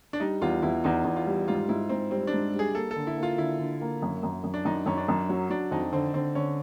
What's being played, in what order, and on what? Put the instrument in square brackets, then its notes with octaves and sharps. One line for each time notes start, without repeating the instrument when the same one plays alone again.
[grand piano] D4
[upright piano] G3 [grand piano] D#4
[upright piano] E2 [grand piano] F4
[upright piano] E2 [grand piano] E4
[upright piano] E2 [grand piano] D#4
[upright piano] E2
[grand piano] F4
[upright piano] G3
[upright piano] G#2 [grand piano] F4
[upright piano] G#2 [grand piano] E4
[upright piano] G#2 [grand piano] C4
[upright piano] G3 [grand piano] C4
[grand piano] D4
[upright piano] G#2
G3
[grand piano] G#4
[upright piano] A#3 [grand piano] A4
[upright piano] D3 [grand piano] A4
[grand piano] E4
[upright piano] A#3
[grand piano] F4
[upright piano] D3 [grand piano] E4
[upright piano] D3
A#3
F#2
F#2
F#2
[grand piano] D4
[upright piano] F#2 [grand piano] D#4
[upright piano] F#2 [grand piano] C#4
[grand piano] D4
[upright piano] F#2
[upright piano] F#3 [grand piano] C#4
[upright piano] F#3 [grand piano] D4
[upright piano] F2 [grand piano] D#4
[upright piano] D3 [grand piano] C4
[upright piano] D3 [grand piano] C4
[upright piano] D3 [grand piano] C#4